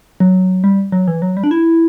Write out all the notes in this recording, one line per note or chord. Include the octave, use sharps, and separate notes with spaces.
F#3
G3
F#3
E3
F#3
G3
D4
E4